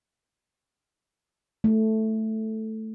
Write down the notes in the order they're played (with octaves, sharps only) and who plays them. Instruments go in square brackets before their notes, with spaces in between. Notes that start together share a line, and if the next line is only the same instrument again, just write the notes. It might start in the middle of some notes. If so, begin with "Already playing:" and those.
[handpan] A3